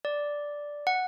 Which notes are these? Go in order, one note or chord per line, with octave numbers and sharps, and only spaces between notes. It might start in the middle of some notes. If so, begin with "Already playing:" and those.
D5
F#5